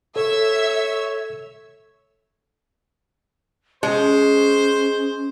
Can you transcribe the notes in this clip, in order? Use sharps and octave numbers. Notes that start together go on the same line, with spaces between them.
A4 C#5 E5 E6
G#3 C#4 C5